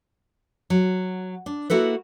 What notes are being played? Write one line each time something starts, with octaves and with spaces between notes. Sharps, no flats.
F#3
D4
A#3 E4 F#4 A4 B4